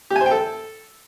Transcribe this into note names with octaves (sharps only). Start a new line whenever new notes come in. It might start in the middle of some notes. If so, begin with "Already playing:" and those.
G4
G#5
C5
G5
A4